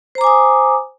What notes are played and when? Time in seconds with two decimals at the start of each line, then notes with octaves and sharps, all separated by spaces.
0.15 C5
0.18 A#5
0.21 D6
0.24 G#5
0.27 D#6